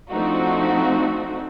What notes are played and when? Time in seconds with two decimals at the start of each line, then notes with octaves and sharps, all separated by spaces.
0.12 F3 A3 C4 D4 D#4 F#4